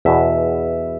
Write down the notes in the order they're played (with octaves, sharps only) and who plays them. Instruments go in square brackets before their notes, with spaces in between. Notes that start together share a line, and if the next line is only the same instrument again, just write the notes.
[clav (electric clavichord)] E2 B2 B3 [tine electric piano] E5